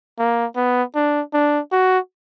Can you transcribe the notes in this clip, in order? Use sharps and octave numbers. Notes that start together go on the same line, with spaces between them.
A#3
B3
D4
D4
F#4